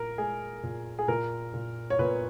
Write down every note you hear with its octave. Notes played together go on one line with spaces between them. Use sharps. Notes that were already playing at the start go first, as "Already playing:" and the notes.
Already playing: A#2 A#4
G#3 G#4
A#2
G#4
A#2 A#4
A#2
C#5
A#2 B4